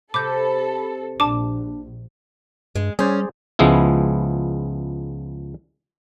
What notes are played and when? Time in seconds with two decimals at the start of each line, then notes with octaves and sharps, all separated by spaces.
0.14 C3 A4 B5 D6 G6
1.20 A#1 D4 A5 D6
2.75 G2 G#3
2.99 G3 C#4 G#4 C5 D5
3.59 C#2 F3 G#3 B3 E4